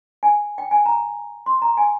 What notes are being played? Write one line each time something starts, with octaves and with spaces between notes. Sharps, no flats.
G#5
G5
G#5
A#5
C6
A#5
G#5